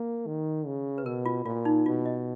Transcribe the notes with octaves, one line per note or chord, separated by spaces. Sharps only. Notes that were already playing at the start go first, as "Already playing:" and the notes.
Already playing: A#3
D#3
C#3
B4
B2 A#4
F4
A#2 F4
D#4
B2 F4
D#5